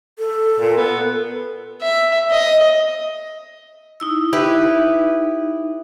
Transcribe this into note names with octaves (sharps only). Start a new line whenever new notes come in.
A4
A#2
B3
E5
D#5
D#4 E4 E6
D#4 E4 G4 B4